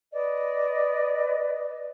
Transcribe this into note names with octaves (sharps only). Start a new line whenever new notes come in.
B4 D5 D#5